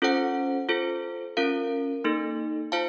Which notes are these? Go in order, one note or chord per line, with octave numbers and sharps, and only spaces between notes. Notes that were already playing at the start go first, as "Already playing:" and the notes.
C#4 F4 A4 C5 F#5
F4 A4 C5
C#4 F4 A#4 F5
A#3 D#4 A4
F4 C5 F5 A5